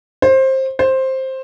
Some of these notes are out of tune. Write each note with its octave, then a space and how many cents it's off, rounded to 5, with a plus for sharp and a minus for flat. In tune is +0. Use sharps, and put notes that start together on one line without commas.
C5 +20
C5 +10